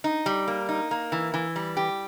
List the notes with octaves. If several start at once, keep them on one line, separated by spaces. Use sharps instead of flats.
D#4
G3
A#3
D#4
A#3
E3
E3
G3
G4